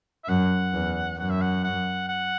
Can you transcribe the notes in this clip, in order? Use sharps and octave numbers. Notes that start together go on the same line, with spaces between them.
E5
F#2 F#5
E2
F#2 F#5
E5
F#5
F#5
F#5